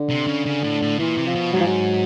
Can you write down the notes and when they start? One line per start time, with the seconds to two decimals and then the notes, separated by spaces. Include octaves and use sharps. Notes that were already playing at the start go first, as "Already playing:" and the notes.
Already playing: D3
0.10 C3
0.27 C#3
0.46 C#3
0.63 A2
0.82 A2
0.99 A#2 E3
1.17 C3
1.27 F3
1.35 B2
1.53 G#2 F#3
1.60 F3
1.67 F#3